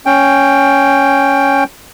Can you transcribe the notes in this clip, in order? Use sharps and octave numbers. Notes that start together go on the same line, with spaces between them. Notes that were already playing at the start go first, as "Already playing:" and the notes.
C#4 G5